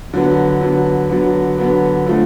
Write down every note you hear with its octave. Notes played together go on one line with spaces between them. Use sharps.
D3 F#3 B3
D3 F#3 B3
D3 F#3 B3
D3 F#3 B3
D3 F3 A3